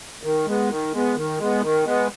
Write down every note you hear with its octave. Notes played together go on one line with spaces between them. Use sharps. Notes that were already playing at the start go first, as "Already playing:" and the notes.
D#3
G#3 B3
D#3
G#3 B3
D#3
G#3 B3
D#3
G#3 B3